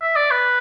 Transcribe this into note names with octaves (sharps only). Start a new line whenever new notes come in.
E5
D5
B4